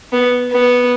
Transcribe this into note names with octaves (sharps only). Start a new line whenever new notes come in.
B3
B3